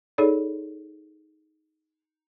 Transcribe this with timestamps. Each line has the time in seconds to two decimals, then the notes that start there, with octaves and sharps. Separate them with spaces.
0.18 D#4 G#4 A4 C#5 D5